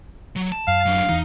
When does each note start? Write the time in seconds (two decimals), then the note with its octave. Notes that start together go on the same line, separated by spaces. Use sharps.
0.36 F#3
0.52 A5
0.68 F#2 F5
0.86 F#3 D4
1.09 E2 E3 D#4